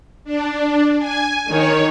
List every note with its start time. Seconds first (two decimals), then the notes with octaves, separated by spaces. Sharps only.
0.24 D4
0.99 G#5
1.48 D#3 C#5